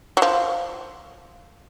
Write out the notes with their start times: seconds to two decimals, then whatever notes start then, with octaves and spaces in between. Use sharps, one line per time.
0.17 F#3
0.22 F3